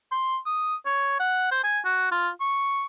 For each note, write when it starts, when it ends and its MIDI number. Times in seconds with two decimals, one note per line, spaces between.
0.11 0.38 84
0.46 0.76 87
0.86 1.19 73
1.20 1.50 78
1.51 1.62 72
1.64 1.79 80
1.84 2.09 66
2.11 2.29 65
2.41 2.86 85